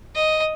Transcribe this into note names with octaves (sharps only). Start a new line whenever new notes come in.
D#5